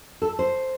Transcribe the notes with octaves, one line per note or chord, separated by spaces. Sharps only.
A4
C5